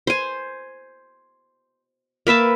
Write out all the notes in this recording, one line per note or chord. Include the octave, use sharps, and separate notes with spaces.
C5 G#5
A#3 B4 E5 A5